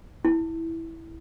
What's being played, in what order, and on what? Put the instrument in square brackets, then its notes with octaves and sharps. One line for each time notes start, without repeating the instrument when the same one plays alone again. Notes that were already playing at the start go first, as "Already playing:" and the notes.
[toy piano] E4